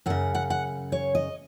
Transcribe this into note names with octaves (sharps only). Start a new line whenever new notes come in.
F#2 C#3 F#5
F#5
F#5
C#5
D#5